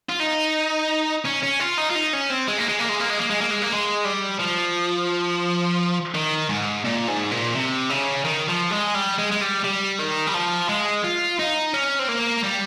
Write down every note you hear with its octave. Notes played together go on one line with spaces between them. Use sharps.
F4
D#4
C#4
C#4
F4
D#4
F4
D#4
C#4
C4
G#3
A#3
G#3
A#3
G#3
A#3
G#3
A#3
G#3
A#3
G#3
A#3
G#3
G3
F3
D#3
G#2
A#2
G#2
A#2
C3
C#3
D#3
F3
G#3
G3
G#3
G#3
G3
G3
D#3
G3
F3
G#3
F4
D#4
C#4
C4
A#3
G3